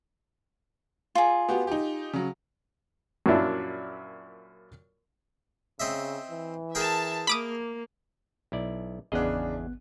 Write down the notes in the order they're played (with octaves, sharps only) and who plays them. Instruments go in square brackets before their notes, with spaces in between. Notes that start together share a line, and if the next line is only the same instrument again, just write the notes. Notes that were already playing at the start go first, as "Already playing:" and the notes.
[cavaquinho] F4 G#4
[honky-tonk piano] B3 F#4 G4
D#4 G4
C#3 F#3
[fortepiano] F#2 A#2 F3 D4 E4
[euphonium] C#3 [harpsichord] C4 D#5 E5
[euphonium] E3
[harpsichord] G#4 A#4 G5 [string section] E5 A5
[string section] A#3 [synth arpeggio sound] B5 D6 D#6
[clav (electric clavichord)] B1 E4 D5
[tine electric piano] G#1 B3 F#6 [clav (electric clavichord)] E2 G#4 D#5 [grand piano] C#3 D4